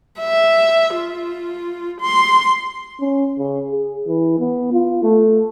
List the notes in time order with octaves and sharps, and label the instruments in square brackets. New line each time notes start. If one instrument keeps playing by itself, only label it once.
[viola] E5
F4
C6
[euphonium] C#4
C#3
G#4
E3
B3
F4
A3